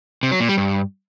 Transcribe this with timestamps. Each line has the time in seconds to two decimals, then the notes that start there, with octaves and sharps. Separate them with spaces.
0.23 C3
0.31 F#3
0.40 A#2
0.49 G3
0.57 G2